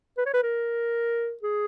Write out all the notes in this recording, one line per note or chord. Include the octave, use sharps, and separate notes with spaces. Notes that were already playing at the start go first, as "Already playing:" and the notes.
B4
C#5
B4
A#4
G#4